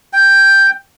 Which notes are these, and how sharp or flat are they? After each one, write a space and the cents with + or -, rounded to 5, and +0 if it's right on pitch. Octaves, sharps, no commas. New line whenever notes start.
G5 +5